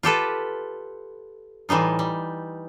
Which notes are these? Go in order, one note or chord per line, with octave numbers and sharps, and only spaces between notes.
F4 G4 A4 B4
A2 E3 G3 D#4 F4
G3